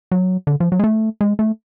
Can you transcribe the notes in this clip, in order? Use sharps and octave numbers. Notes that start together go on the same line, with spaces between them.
F#3
D3
F3
F#3
G#3
A3
G#3
A3